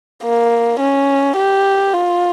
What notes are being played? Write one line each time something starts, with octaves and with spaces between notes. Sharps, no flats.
A#3
C#4
G4
F4